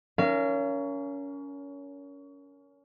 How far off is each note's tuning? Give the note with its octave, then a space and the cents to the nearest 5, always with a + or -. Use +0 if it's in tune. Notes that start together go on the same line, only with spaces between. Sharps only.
C#4 +25 A#4 +0 F5 -35